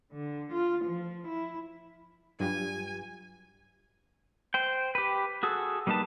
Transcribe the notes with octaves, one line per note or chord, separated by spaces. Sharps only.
D3
F4
F3
E4
G2 F#3 F4 G4 G#5
C5 G5
G4 B4
F#4 G#4 A4
G3 A#3 D#4 B4 A5